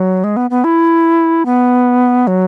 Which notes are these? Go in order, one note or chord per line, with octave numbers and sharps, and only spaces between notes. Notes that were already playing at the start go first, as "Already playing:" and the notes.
Already playing: F#3
G#3
B3
B3
E4
B3
F#3